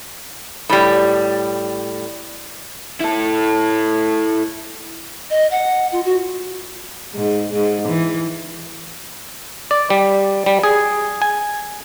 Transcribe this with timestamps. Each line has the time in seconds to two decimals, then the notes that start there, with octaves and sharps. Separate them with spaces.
0.70 A2 G3
3.00 E4 A4
5.30 D#5
5.51 F#5
5.92 F4
6.05 F#4
7.15 G#2
7.53 G#2
7.88 E3
9.71 D5
9.90 G3
10.46 G3
10.64 G#4
11.22 G#5